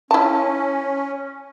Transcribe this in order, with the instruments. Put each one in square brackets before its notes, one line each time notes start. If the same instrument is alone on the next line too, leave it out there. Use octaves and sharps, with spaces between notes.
[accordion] C#4 [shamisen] E4 A5